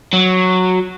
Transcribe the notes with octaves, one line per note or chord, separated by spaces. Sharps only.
F#3